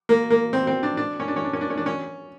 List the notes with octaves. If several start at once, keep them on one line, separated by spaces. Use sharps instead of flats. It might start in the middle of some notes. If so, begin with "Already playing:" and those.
A#3
A#3
C4
C4
D4
D4
C#4
D4
C#4
D4
C#4
D4
C#4
D4
C#4